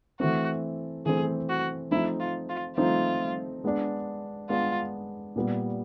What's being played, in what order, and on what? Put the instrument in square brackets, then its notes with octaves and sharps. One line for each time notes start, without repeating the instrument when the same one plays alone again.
[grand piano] E3 A3 C4 [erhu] F#4
[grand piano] E3 A3 C4 [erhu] G#4
[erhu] F#4
[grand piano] F3 A3 C4 D#4 [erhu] E4
[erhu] F4
F4
[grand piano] F3 A3 C4 D#4 [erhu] F4
[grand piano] G#3 B3 D4
[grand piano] G#3 B3 D4 [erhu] F4
[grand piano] A#2 G3 B3